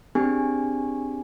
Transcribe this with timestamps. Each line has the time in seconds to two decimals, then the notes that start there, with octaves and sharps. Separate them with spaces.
0.15 C4 D4 G4 G#4 G#5